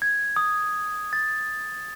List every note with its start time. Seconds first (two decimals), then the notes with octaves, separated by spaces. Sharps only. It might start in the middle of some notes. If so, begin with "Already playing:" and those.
0.02 G#6
0.36 D#6
1.13 A6